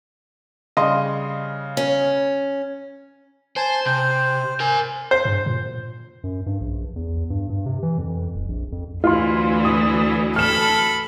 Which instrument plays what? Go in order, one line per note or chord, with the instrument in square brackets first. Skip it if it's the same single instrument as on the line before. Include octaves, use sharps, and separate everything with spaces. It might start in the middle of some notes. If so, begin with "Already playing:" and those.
[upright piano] C#3 G3 [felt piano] D#5 F5 C6
[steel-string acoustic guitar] C#4
[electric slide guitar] C5 [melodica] G#5 A5
[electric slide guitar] C3 [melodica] C5
[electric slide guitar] A#4 G#5
[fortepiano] C5
[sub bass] G2
A#2
F#2
G2
A#1
E2
G2
G2
C3
E3
F2
D1
A#1
F2
[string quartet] D2 E3 F#3 [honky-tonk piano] F4 C6
[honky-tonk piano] D#6
[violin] A4 B5 [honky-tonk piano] F6 E7